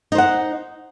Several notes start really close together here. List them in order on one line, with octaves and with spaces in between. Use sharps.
D#4 C5 F#5